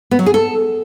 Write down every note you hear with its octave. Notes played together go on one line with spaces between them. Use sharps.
B3
F#3
G#4
A4